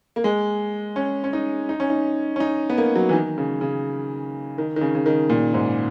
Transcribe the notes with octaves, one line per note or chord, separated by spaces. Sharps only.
A#3
G#3
C#4
C#4
D#4
D#4
C#4
D#4
C#4
D#4
B3
A#3
F#3
E3
D#3
C#3
C#3
D#3
D#3
C#3
C#3
D#3
A#2
G#2